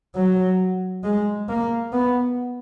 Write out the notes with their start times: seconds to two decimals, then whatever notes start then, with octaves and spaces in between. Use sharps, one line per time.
0.15 F#3
1.04 G#3
1.49 A#3
1.93 B3